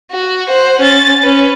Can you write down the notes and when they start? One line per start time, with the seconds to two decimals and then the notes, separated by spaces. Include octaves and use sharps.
0.12 F#4
0.48 C5 F#5
0.80 C#4 A6
1.23 C#4 B4